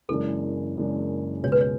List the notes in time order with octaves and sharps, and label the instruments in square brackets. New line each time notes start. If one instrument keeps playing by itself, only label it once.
[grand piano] F#1 F#2 E3 G#3 D4 [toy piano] A4
[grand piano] F#1 F#2 E3 G#3 D4
[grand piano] C#2 B2 G#3 [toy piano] C#5
[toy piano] B4
C#5